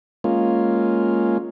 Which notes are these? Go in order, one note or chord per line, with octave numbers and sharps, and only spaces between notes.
G#3 A#3 C#4 F4